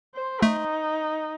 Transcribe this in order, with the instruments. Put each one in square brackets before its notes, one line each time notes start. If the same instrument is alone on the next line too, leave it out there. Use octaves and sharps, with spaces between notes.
[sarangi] C5
[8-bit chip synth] A3 [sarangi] D#4